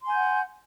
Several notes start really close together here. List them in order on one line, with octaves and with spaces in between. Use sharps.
C6 G#5 G6 F#5